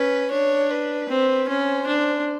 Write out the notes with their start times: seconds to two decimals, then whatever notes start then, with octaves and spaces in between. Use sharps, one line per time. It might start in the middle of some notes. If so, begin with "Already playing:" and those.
Already playing: C#4 B4
0.32 D4 C#5
0.71 B4
1.09 C4
1.48 C#4 C5
1.87 D4